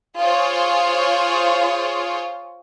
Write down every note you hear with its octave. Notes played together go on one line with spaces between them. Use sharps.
F4 G#4 C5 C#5